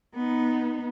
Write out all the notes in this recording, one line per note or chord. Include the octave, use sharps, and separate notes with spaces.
B3 D#4